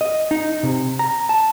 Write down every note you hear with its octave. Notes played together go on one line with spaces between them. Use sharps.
D#5
D#4
C3
A#5
A5